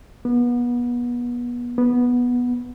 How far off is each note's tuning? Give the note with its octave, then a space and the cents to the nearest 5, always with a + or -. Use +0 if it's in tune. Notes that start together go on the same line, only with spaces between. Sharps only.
B3 -30
B3 -10